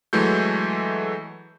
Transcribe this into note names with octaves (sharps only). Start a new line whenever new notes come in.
E3 F#3 G#3 A3 G6